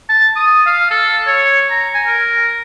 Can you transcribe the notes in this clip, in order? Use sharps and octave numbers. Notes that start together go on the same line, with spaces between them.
A5
D#6
F5
A4
C#5
A#5
G#5
A#4